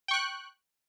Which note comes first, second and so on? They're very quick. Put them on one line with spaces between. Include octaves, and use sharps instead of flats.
G5 C#6 F#6